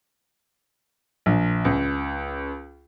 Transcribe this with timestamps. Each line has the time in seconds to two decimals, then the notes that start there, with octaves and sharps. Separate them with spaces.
1.26 A#1
1.65 C#2